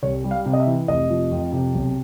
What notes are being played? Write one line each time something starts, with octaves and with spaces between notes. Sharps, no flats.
C2 C#5
G3
F5
C3
D#5
E5
E3
F1 D#5
F3
F2
C3
B1